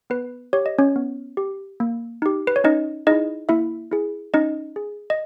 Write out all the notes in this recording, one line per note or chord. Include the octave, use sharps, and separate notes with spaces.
B3 B4
G4 C#5
D#5
C#4 C#5
B3
G4
A#3
D#4 G4
B4
C#5
C#4 D#4 D#5
D#4 E4 G#4 D#5
A#3 E4 E5
E4 G#4
C#4 D#4 D#5
G#4
D#5